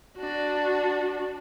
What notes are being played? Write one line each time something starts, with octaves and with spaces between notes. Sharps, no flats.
D4 F#4